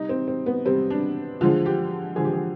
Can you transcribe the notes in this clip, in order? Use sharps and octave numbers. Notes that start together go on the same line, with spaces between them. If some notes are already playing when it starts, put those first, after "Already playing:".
Already playing: C3 G3 D#4
C4
C4
B3
C3 G3 C4
D4
D3 F3 G#3 F4
G4
D3 F3 G#3 G#4
G4
G#4